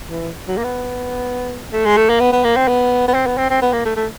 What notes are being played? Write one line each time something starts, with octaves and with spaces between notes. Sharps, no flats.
E3
F#3
A#3
B3
A3
G#3
A3
A#3
B3
B3
A#3
C4
B3
B3
C4
B3
C4
C4
B3
A#3
A3
A3